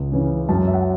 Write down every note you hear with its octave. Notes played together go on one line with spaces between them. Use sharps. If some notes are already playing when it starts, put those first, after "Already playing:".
Already playing: C#2
C#3 E3 C#4
F#2 A5
E5
F#5